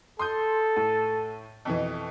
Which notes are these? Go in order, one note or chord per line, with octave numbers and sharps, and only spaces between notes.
A4 C6 D#6 G6
A2
F2 B2 E3